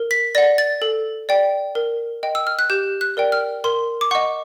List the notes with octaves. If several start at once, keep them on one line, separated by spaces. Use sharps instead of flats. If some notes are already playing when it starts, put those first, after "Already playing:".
Already playing: A#4
B6
D5 F#5 A#6
A6
A4
D5 G5
A#4
D#5 G5
E6
F6
F#6
G4 G6
F#6
A#4 D5 G5
F6
A#4 C6
D6
D#5 F#5 C#6